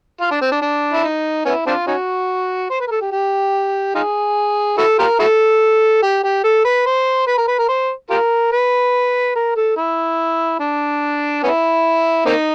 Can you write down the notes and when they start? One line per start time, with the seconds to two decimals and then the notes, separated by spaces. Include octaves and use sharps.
0.21 F4
0.31 D4
0.42 C4
0.52 D4
0.62 D4
0.93 E4
1.04 D#4
1.46 B3 C#4 E4
1.67 C4 D4 F4
1.87 C#4 D#4 F#4
2.70 C5
2.80 B4
2.87 A#4
2.91 A4
3.01 G4
3.12 G4
3.95 D#4 F4 G#4
4.78 E4 F#4 A4
4.99 F4 G4 A#4
5.19 E4 F#4 A4
6.03 G4
6.24 G4
6.44 A4
6.65 B4
6.86 C5
7.27 B4
7.38 A#4
7.48 B4
7.59 A#4
7.68 C5
8.10 F4 G4 A#4
8.52 B4
9.35 A#4
9.56 A4
9.77 E4
10.60 D4
11.43 B3 C#4 E4
12.26 A#3 C4 D#4